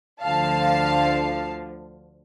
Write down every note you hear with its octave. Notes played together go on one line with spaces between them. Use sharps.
D2 D3 F3 F5 A5